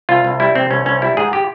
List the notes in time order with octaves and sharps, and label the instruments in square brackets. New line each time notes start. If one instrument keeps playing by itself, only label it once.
[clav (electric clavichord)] C2 F4
C2
G3 E4
C3 C4
C2 C#4
C2 C#4
G3 E4
G#2 G#4
G4